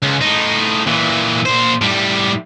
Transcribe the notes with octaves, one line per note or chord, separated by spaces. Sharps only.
C#2
A2 D#4
A#2 E3
A#2 C5
A2 G3